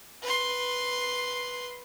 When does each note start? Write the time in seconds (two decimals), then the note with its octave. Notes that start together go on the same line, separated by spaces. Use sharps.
0.23 B4 C6